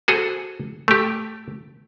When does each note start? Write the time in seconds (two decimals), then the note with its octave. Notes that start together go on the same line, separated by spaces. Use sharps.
0.08 F#4 G#4 A4 C5
0.88 A3 G4